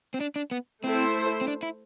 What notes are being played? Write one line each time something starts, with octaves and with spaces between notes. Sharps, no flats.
C4
D4
D4
B3
A3 C4 E4 A4 C5
C4
D4
E4